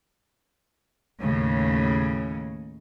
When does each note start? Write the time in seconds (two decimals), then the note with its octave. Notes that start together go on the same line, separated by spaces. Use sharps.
1.22 D#2 A2 C#3